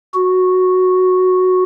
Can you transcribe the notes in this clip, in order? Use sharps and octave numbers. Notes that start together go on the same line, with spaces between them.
F#4